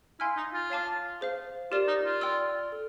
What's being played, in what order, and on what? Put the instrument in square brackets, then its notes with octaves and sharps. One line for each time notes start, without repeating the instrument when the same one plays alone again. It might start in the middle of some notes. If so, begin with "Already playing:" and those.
[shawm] E4 [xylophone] F5 G#5 C6 F6
[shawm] D#4
F4
[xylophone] C#5 F5 A5 D6 F6
G#4 C5 F5
[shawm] F4 [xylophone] G4 A#4 D5
[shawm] D#4
F4
[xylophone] D5 G5 C6 E6
A4